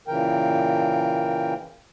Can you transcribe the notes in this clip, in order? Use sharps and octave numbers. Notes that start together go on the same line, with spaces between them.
A#2 C#3 E3 A#4 G5